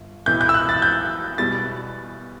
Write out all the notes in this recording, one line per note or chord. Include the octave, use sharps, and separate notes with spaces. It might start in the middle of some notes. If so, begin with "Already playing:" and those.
Already playing: G1
B1 A2 E3 G6
G6
E6
F#6
A6
G6
E2 B2 G3 A6